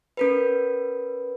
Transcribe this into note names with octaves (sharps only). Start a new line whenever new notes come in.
C#4 A#4 B4